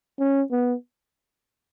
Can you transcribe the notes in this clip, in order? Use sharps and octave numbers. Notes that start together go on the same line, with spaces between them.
C#4
B3